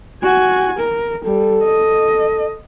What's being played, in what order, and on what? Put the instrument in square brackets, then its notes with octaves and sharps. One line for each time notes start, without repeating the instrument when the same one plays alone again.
[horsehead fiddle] F#4 G#5
A#4
[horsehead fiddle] G3 [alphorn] A4
[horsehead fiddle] D#5